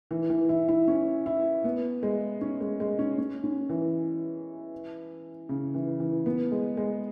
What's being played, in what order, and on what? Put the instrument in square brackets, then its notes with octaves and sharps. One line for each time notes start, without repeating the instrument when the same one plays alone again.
[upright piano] E3
E3
E4
E4
C#4
E4
B3
G#3
C#4
G#3
G#3
C#4
C#4
C#4
E3
C#3
E3
E3
B3
G#3
G#3